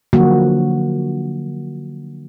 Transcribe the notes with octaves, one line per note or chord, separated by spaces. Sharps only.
D3 F3 F#3 A#3 F#4